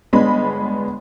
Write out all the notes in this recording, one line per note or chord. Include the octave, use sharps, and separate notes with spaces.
G1 G#3 B3 D4 B5